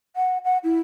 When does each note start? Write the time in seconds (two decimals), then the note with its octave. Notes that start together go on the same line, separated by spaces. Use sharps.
0.16 F#5
0.45 F#5
0.64 E4